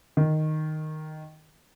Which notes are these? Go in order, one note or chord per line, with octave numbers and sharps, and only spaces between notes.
D#3